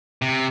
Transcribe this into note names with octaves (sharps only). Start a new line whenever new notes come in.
C3